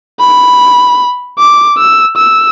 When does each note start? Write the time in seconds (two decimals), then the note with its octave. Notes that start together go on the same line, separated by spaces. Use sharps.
0.20 B5
1.39 D6
1.78 E6
2.17 E6